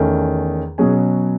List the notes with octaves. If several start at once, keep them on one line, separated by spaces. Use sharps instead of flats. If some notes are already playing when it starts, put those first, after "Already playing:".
Already playing: E2 D#3 A3 C#4
B2 F#3 C#4 G#4 G#5